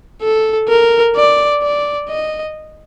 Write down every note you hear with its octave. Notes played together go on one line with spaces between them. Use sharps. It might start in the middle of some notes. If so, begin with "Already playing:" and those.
A4
A#4
D5
D5
D#5